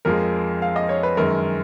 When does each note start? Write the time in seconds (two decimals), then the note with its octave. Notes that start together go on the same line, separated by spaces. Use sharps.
0.05 F2 F3 G#3 A#4
0.62 F5
0.76 D#5
0.89 C#5
1.03 B4
1.17 F#2 D#3 G#3 A#4